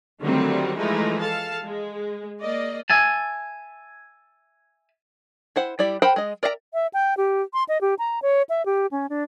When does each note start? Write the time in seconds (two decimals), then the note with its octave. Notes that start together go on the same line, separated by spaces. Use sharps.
0.22 D3 D#3 F#3 G3 A3 C4
0.78 E3 F3 G#3 A3 D#4 E4
1.20 A4 F5 A5
1.64 G#3
2.41 A#3 D5 D#5
2.90 E5 G#5 A5
5.56 E4 C5 F#5
5.79 G3 E4 D5
6.02 A#4 C5 F#5 G5 B5
6.16 G#3 D#5
6.43 A#4 D5 E5 F5 A#5
6.74 E5
6.94 G5
7.17 G4
7.53 C6
7.69 D#5
7.81 G4
7.99 A#5
8.22 C#5
8.49 E5
8.66 G4
8.91 C#4
9.10 D4